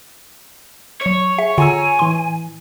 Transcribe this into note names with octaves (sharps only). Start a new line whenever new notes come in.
F#3 C#5 C#7
G#4 E5
D3 F4 G#4 F#5 G#5 A#5 E6
A2 E3 C6